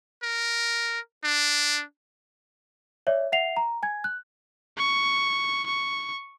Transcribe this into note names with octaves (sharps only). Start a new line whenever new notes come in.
A#4
D4
C#5 D5 E5
E5 F#5 C7 F7
A#5
G#5 G#6
F#6
C#6
C#6